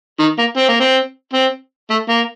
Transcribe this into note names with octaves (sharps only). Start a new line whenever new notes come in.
D#3
A#3
C4
A#3
C4
C4
A3
A#3